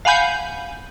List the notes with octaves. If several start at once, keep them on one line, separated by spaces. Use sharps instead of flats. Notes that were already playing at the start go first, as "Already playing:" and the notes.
F5 F#5 G#5 B5 G6